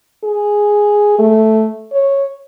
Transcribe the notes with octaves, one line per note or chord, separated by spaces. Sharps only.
G#4
A3
C#5